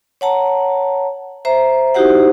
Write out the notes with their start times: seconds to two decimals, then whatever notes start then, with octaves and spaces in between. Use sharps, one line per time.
0.21 C#5 F#5 A5 A#5
1.45 C5 E5 A#5
1.95 D#4 E4 F#4 G4 C5 F#5